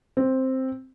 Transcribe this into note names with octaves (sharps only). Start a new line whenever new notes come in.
C4